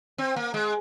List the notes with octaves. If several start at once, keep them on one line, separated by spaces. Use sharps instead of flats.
C4
A#3
G#3